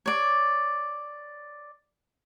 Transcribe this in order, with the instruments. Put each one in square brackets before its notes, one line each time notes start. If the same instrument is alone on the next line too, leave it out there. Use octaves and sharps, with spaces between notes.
[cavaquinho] C#5 D5